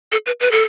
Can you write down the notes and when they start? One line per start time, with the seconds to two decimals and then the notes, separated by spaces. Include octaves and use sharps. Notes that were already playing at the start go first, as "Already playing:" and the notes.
0.12 A4
0.26 B4
0.41 B4
0.52 A4